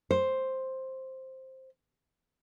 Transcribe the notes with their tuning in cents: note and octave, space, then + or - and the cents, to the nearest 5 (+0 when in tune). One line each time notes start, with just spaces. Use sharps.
C5 +5